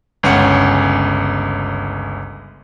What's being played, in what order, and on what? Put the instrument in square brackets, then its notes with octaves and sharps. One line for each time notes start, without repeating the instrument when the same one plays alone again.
[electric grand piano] G1 C#2 C#4 F#5 C#7